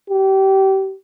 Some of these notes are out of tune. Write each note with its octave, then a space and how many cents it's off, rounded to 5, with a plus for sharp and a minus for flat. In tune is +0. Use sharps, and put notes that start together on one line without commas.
G4 -30